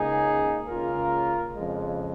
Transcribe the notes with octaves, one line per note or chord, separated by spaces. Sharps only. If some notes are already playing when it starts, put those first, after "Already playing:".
Already playing: C#2 C#3 A#3 D#4 G#4
C#2 C#3 A#3 F4 A#4
F2 C#3 G#3